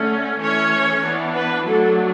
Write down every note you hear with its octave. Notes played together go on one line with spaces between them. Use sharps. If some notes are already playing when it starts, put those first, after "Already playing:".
Already playing: D3 A3 C#4
E3 A3 C#4 C#5
E3 B3 D4
B4
F#3 A3 D4 A4